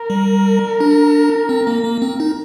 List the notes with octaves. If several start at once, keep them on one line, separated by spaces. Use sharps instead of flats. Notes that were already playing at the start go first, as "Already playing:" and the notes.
Already playing: A#4
G3
D4
C4
A#3
A#3
C4
D#4